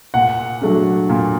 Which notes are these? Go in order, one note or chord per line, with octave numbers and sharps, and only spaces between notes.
A#2 F#5
F#3 A3 D4
A#2